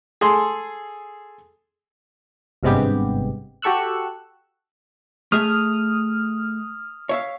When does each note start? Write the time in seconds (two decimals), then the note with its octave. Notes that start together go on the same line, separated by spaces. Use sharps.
0.21 G#4 A4 C6
2.63 G#1 G2 C3 G#3 B3 G4
3.62 F#4 G4 A4 C#6 E6 F#6
5.32 A3 G#4 E5 D#6 F6
7.09 C#5 E5 F5